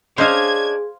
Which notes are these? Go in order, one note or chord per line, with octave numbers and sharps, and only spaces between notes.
C#4 D4 G#4 C5 D#5 F5 G#6